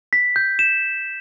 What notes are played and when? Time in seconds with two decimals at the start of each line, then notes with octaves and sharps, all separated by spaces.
0.13 B6
0.36 G6
0.59 E7